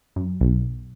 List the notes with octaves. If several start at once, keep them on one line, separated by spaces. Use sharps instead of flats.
F#2
B1